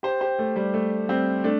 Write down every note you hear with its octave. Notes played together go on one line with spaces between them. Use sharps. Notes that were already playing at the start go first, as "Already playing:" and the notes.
G4 C5
G4 C5
A3
G3
A3
G3 C4
A3 D4